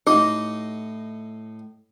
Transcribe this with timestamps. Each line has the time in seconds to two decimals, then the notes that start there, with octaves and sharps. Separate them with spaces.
0.07 A2 D#4 G4 D#5 D6